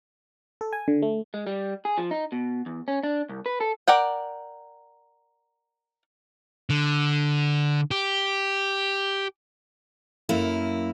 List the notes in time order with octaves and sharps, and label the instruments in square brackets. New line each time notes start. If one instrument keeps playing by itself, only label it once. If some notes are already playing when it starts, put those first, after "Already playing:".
[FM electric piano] A4
G#5
D3
A3
[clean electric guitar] G#3
G3
G#4
F3
D#4
B2
E2
C#4
D4
C2
B4
A4
[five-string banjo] A#4 D5 F#5 G5
[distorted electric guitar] D3
G4
[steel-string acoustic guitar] F#2 A#3 E4